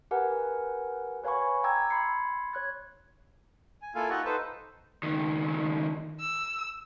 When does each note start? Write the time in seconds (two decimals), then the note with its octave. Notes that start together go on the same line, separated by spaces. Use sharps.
0.11 G4 A#4 B4 F#5 G#5
1.24 B4 C#5 F5 G#5 B5 C#6
1.64 G5 A#5 D6 E6 G#6
1.90 B5 C6 G#6 C7 C#7
2.53 C#5 F#6 G#6
3.82 G#5
3.95 A#3 E4 F4 A4 F5 G#5
4.10 D#4 F4 G4 D#5 F#5 C#6
4.25 D#4 A4 B4 C5
5.03 C#2 D#3
6.20 E6